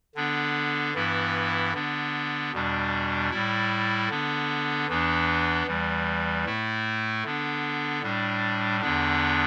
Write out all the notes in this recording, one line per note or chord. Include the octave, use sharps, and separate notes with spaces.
D3 B3 D4
G2 E3 B3 E4
D3 B3 D4
E2 B2 G3 D4
A2 G3 E4
D3 B3 D4
E2 E3 B3 D4
E2 E3 G3
A2 A3 E4
D3 B3 D4
A2 G3 D4
E2 D3 B3 D4